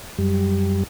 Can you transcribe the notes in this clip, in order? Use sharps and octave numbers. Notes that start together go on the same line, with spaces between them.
F#2 G3